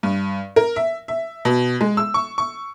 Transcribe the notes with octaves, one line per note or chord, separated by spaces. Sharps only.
G2
A#4
E5
E5
B2
G#3
E6
C#6
C#6